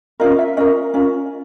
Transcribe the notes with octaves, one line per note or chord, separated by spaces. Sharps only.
C#4 F4 A#4 D#5
E5
C#4 F4 A#4 D#5
C#4 F4 A#4